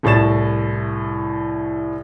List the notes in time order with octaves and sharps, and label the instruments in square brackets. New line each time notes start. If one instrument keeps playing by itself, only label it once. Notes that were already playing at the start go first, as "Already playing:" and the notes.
[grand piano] C2 A2 C#5 A6 E7